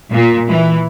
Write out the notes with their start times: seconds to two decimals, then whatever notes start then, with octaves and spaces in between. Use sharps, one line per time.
0.12 A#2
0.48 E3